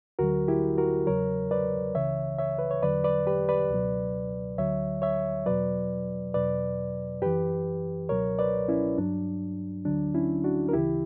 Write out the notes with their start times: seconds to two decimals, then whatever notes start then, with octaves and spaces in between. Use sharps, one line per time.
0.19 D2 D3 F#3 F#4 A#4
0.48 E4 G4
0.78 F#4 A#4
1.07 E2 C#3 F#3 A#4 C#5
1.51 B4 D5
1.95 C#2 C#3 E3 C#5 E5
2.39 C#5 E5
2.58 B4
2.71 C#5
2.82 E2 D3 F#3 B4 D5
3.04 B4 D5
3.27 G4 B4
3.49 B4 D5
3.71 C#2 B2 F#3
4.58 D2 D3 F#3 C#5 E5
5.02 C#5 E5
5.46 E2 B2 F#3 B4 D5
6.34 E2 B2 F#3 B4 D5
7.22 F#2 E3 G4 B4
8.09 C#2 B2 F#3 A#4 C#5
8.39 B4 D5
8.68 C#4 E4
8.98 G2 F#3 D4
9.85 D2 D3 F#3 D4
10.15 C#4 E4
10.44 D4 F#4
10.69 A#4
10.73 D2 C#3 E3 E4 G4